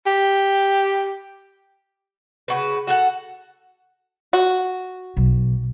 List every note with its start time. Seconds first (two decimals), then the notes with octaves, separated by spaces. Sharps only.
0.06 G4
2.48 C#3 F#4 B4
2.87 F#4 A4 F#5
4.33 F#4
5.17 B1